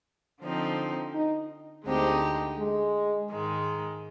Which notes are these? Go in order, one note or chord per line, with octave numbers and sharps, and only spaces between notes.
D3 F3 C4 D#4
D#4
D2 D3 G#3 C4 D#4 G4
G#3
G#2 D#3 G#3